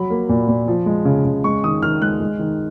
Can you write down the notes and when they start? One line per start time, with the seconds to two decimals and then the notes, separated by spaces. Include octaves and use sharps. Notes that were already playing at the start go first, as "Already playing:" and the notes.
Already playing: F#3 B5
0.10 A#3
0.29 A#2
0.48 A#2
0.68 F3
0.86 G#3
1.05 C#3
1.25 C#3
1.44 G#3 C#6
1.64 D#3 D#6
1.83 D#3 F6
2.02 G#3 F#6
2.20 G#3
2.39 D#3